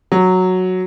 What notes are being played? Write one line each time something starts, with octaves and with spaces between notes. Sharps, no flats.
F#3